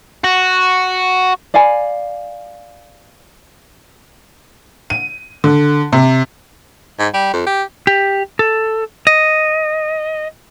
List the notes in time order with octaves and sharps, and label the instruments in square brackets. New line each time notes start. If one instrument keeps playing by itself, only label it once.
[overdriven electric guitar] F#4
[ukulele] D5 F5 G#5 B5
[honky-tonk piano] D#7
D3
C3
[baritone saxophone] G#2
G3
F2
G4
[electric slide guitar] G4
A4
D#5